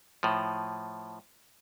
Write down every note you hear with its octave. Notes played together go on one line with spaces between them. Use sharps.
A2 F3